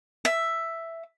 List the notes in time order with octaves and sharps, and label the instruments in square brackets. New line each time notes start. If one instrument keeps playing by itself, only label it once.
[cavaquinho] E5